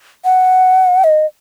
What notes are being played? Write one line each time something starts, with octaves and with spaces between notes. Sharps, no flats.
F#5
D#5